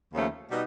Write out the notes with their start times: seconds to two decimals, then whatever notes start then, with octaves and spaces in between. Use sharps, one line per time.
0.13 D#2 C#3 F3 A3 C#4
0.50 B2 G3 B3 D#4